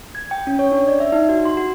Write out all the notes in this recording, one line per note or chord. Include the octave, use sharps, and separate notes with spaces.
G#6
G5
C#4
C#5
D4
D5
E5
D#4
F#4
C6
F#4